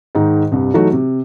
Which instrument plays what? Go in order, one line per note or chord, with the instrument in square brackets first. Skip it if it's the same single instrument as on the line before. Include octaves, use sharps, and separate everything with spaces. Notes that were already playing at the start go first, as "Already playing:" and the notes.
[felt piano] G#2 D#3 D#4
C2 G2
E3 F#3 A3 D#4 F#4
C3